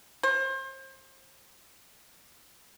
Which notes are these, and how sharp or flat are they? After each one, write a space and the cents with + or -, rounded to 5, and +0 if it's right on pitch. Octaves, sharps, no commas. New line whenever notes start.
C5 +30